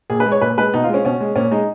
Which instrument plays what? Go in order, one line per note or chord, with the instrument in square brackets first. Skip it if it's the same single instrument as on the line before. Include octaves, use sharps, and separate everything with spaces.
[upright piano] A#2 G#4
B4
G#3
C#5
A#2 B4
G#3 B4
B2 D#4
F4
G#3
C#4
B2 C#4
G#3
A#2 C#4
G#3 D#4